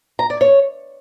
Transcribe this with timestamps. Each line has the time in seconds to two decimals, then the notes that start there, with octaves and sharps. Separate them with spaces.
0.19 A#5
0.30 D5
0.41 C#5